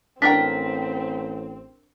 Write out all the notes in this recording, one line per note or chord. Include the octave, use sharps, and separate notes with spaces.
A1 C4 D4 A#4 G5 B6